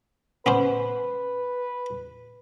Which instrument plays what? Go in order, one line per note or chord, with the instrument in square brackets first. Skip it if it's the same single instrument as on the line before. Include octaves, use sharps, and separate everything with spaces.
[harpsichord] B3 C#4 C5 [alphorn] B4